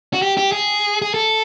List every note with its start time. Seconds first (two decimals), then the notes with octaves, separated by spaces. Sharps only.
0.13 F#4
0.22 G4
0.37 G4
0.52 G#4
1.02 G#4
1.14 A4